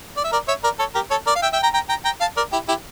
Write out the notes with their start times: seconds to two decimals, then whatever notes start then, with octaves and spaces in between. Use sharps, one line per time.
0.17 D5
0.24 E5
0.32 A#4 D5
0.48 C#5 E5
0.64 A#4 D5
0.79 A4 C#5
0.95 G4 A#4
1.10 A4 C#5
1.26 A#4 D5
1.35 F5
1.42 E5 G5
1.53 E5 G5
1.63 G5 A#5
1.74 G5 A#5
1.89 G5 A#5
2.05 G5 A#5
2.20 F5 A5
2.37 A#4 D5
2.53 E4 G4
2.68 E4 G4